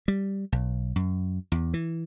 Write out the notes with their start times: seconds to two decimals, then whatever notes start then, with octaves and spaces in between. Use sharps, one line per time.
0.08 G3
0.52 B1
0.96 F#2
1.52 E2
1.74 E3